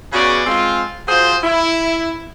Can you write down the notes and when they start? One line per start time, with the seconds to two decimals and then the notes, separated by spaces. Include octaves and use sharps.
0.13 C#3 B3 C#4 F#4 G#4 D5
0.46 G#3 C4 F4
1.08 F#3 F4 G#4 C5
1.42 E4